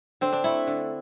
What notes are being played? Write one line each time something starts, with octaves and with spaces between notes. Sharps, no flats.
D3 C4
D4
A3 E4
D3